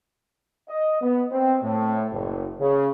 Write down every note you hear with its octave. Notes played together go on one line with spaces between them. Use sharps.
D#5
B3
C4
A2
F#1
C#3